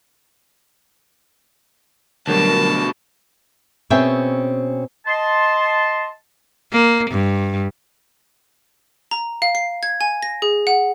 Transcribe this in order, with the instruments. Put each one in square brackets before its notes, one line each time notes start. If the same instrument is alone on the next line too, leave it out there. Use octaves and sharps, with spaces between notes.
[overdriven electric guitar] D2 B2 [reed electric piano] D3 F#3 G3 [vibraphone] A#4 [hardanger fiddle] A5
[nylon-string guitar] B2 C4 C#4 G#4 E5 G5
[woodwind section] D#5 A5 C6
[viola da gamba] A#3
G2
[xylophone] A#5
F5
C7
G#6
G#5
A#6
G#4
F#5